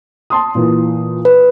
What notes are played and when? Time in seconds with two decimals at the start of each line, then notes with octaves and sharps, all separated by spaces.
0.30 A5 C6 D#6
0.55 A#2 E3
1.25 B4